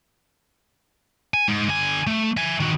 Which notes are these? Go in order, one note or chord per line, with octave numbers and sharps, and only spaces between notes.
G#5
G#2
D3 G#5
A3
E5 G#5
D#3 F#4